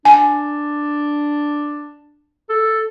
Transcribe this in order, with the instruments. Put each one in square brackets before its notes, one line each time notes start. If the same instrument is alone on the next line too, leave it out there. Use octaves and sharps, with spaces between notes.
[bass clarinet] D4 [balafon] G#5
[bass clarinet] A4